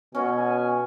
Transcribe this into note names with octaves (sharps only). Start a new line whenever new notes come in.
B2 C#4 F#4 G#5